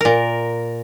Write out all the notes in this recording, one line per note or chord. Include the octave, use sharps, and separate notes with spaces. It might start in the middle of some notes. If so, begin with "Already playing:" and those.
A#2 A#4